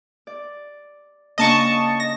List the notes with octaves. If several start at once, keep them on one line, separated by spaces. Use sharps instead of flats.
D5
C#3 A#3 D4 D#5 A5 C#6
D#5 A#6